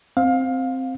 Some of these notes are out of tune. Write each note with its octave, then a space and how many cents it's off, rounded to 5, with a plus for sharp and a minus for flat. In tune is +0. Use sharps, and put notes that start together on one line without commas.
C4 +0 F5 +20